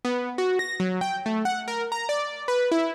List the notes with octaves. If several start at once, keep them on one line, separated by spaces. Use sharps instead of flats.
B3
F#4
A#6
F#3
G5
A3
F#5
A#4
A#5
D5
B4
E4